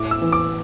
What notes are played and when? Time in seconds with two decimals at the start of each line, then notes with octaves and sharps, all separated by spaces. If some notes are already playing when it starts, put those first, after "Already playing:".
Already playing: A2 D6
0.11 E6
0.22 E3
0.32 D6